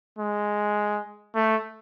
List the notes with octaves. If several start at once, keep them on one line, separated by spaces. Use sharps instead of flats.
G#3
A3